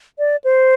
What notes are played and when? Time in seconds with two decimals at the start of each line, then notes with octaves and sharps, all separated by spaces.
0.19 D5
0.44 C5